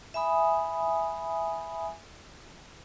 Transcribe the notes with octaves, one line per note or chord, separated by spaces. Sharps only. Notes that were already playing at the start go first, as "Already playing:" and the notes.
E5 G#5 B5 D#6